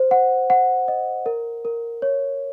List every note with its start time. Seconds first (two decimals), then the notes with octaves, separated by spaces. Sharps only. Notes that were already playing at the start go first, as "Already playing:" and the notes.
Already playing: C5
0.11 F#5
0.50 F#5
0.88 D#5
1.26 A#4
1.65 A#4
2.02 C#5